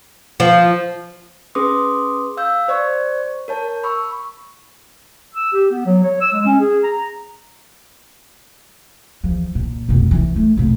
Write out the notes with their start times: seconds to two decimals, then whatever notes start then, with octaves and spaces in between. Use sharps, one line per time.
0.40 F3
1.55 C#4 G#4 B4 C6 D6 D#6
2.37 F5 E6 G6
2.68 C5 D5 C#6
3.48 A#4 C#5 A5
3.84 B5 C#6 E6
5.34 E6
5.52 G4
5.71 B3
5.85 F#3
6.03 C#5
6.20 E6
6.33 G#3
6.45 C#4
6.61 G#4
6.83 A#5
9.24 E2 F3
9.55 A#2
9.89 F1 B2
10.11 E3
10.36 A3
10.57 F1 A#2